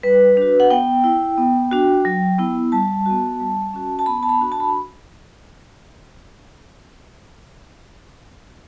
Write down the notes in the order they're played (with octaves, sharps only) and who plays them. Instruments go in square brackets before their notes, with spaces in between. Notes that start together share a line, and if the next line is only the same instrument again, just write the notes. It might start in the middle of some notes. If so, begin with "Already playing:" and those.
[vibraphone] G3 B4
D4 F#4
F#5
B3 G5
E4
B3
D4 F#4
F#3
B3 E4
G3 A5
B3 F#4
G3
C#4 F#4
A5
B3 B5
A5
B5
D4 F#4
A5
B5